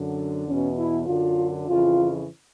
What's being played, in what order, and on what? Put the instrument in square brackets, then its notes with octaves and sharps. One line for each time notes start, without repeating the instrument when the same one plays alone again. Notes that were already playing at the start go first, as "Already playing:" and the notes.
Already playing: [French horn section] F#2 D3
E2 B2 C#4
E4
F#2 D3 F4
F2 C#3 E3 F4